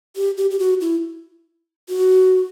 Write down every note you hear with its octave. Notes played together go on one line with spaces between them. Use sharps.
G4
G4
G4
F#4
E4
F#4